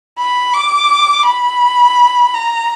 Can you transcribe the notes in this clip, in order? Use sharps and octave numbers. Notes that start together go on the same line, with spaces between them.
B5
D6
B5
A#5